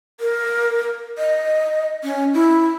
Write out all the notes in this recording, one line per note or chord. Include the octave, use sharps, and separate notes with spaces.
A#4
D#5
C#4
E4